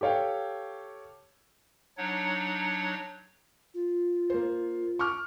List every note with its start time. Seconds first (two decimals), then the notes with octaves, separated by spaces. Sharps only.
0.01 G4 A4 C#5 F5 G5
1.98 F#3 D4 D#4 C#5 F#5
3.74 F4
4.30 A#3 C5
4.99 C#6 D6 F6